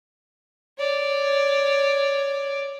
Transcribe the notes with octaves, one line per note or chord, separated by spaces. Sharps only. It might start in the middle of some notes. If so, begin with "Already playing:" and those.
C#5 D5